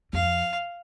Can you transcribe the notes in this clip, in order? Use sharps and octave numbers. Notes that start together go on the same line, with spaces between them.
F2 F5